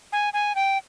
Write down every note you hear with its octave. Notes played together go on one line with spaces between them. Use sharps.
G#5
G#5
G5